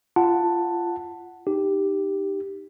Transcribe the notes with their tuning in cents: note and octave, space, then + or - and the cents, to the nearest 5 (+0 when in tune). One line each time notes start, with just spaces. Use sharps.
F4 -15 F#5 +0 A5 +10
D#4 -10 G4 +0